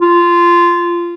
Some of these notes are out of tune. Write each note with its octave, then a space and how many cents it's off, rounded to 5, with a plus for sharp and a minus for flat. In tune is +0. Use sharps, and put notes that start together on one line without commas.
F4 -15